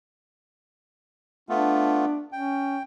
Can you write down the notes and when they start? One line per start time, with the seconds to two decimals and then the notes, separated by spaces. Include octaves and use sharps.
1.49 A3 B3 D4 F4
2.32 C#4 G5